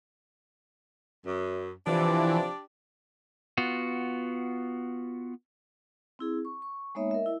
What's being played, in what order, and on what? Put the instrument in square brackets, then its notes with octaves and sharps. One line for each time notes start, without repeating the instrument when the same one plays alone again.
[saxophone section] F#2
[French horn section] C3 F3 [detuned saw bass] E3 [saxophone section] D4 G4 D5
[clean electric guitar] B3 F4 F#4
[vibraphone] C4 E4 G#4
C#6
C#6
G#3 A#3 B3 D#4 C#5 E5
A#4 D#5 E5
E4